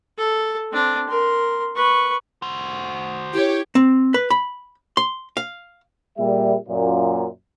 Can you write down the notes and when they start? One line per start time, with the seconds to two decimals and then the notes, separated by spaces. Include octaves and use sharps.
0.17 A4
0.72 C4 D4
1.08 A#4 C6
1.76 B4 C#6
2.42 F#4 C5
3.34 E4 G4 C#5
3.75 C4
4.14 B4
4.30 B5
4.97 C6
5.37 F5
6.19 A#2 G3 G#4 E5
6.69 F#2 A#2